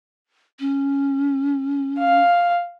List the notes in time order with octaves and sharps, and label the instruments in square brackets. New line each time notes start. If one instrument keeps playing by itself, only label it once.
[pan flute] C#4
[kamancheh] F5